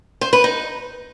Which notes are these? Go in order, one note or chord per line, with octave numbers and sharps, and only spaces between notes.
C5
B4
D#4